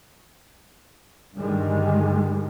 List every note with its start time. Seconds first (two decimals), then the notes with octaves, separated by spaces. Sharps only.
1.36 G2 D3 D#3 G3 G#3